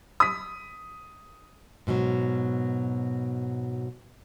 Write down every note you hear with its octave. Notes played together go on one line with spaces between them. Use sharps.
D#6 B6
G#2 B2 E3 F#3